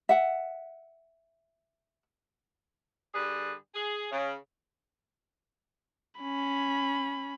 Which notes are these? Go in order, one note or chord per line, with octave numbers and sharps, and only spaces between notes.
E5 F#5
G2 D3 G3 G#4 B4
G#4
C#3
C#4 B5